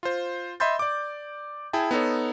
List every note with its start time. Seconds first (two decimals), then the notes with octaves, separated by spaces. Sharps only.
0.03 F4 C5
0.60 D#5 E5 B5 C6 G6 A6
0.79 D5 D6
1.73 E4 G#4 G5 A5
1.91 B3 D#4 A4 C#5